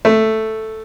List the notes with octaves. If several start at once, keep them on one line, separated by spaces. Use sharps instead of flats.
A3